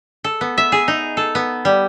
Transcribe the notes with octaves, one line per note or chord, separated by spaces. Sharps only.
A4
B3
E5
G#4
D#4
A4
B3
G3